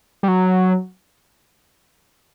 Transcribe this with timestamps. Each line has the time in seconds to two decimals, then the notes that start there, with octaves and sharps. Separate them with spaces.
0.23 G3
0.28 F#3